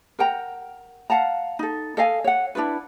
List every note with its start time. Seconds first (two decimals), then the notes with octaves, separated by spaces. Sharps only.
0.19 A#4 F#5 G5 A#5
1.10 F5 F#5 A5 A#5
1.59 D#4 A4
1.97 A4 D#5 F5 G#5
2.24 C#5 F#5
2.55 D4 E4 F4 B4